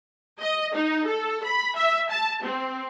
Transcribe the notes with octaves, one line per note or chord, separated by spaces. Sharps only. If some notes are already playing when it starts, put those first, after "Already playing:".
D#5
D#4
A4
B5
E5
A5
C4